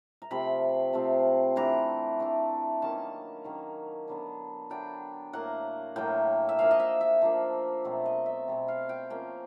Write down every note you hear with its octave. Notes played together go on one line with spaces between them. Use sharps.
A#5
C3 F3 A3 C4 B5
C3 F3 A3 C4
E3 A3 D4 A#5
E3 A3 D4
D#3 F#3 A#3 C#4 A5
D#3 F#3 A#3 C#4
D3 F#3 B3 D4
D3 F#3 B3 D4 G5
A2 F#3 A#3 F#5
A2 F#3 A#3 G5
E5
F3 A#3 D4 F5
D#5
E5
E5
F3 A#3 D4
B2 F#3 A3 C4
D#5
E5
B2 F#3 A3 C4
F5
G5
F3 A#3 C#4 G5